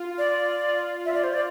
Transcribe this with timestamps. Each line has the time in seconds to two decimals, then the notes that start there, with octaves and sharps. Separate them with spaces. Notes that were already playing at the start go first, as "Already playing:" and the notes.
Already playing: F4
0.18 D5
0.68 F4
1.05 F4 E5
1.14 D5
1.24 C5
1.34 D5